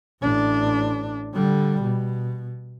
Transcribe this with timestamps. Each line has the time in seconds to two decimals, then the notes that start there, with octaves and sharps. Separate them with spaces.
0.22 A1 D4
1.33 D3 G3
1.83 B2